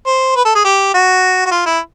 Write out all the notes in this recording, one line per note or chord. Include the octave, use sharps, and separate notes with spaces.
C5
B4
A4
G#4
G4
F#4
F#4
F4
E4